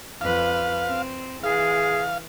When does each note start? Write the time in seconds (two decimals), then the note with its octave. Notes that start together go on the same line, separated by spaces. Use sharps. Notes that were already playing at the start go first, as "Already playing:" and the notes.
0.21 F2 B4 F5
0.86 C4
1.44 E3 G#4 F5